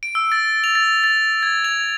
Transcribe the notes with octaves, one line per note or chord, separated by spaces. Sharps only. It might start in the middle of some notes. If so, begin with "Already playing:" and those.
D7
E6
A6
F7
A6
A6
G#6
F7